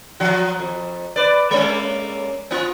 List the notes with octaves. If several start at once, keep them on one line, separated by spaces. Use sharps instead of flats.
F3 F#4
F2
B4 D5
G#3 A#3 C#4
B3 F4